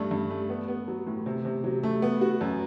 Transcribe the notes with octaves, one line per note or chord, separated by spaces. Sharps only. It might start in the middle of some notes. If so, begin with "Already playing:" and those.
Already playing: G2 A3
G2
A3
B3
B3
F#3
A2
C3
C3
F#3
A3
B3
F#4
F#2